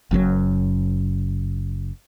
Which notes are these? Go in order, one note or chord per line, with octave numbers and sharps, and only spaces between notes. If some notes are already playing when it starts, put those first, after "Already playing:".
F#1 F#2 C3 F#3